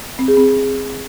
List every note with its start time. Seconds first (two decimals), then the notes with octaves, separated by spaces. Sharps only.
0.19 C4
0.28 G#4
0.37 C4